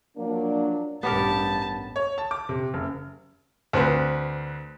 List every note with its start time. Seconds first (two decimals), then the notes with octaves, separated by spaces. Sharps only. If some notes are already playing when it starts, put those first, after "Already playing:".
0.17 F3 F#3 A#3 D4
1.03 A1 G2 B3 G4 A#4 A5
1.96 C#5
2.18 A5
2.31 D6
2.49 C3
2.74 F#1
3.73 D2 C4 B4